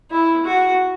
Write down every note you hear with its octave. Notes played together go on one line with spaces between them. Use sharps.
E4
F#4